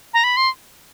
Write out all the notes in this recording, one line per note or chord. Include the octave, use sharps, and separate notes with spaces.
A#5
B5
C6